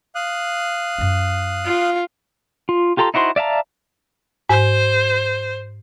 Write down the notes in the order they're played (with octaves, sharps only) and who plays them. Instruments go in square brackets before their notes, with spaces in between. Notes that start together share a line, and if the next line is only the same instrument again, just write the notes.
[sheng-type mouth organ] F5 D#6 F#6
[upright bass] F#2 F4
[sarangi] F4
[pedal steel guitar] F4
F4 G4 A4 A#5 C6
D#4 E4 F#4 C5 C6
D5 E5 F5 A5 A#5
[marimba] G#2 [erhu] C5